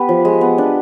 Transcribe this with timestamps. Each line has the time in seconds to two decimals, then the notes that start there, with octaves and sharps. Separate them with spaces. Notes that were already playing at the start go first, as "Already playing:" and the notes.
Already playing: B3 G4 B4
0.09 F3
0.25 G#3
0.41 B3
0.58 D4